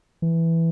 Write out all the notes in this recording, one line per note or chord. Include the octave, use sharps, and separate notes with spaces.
E3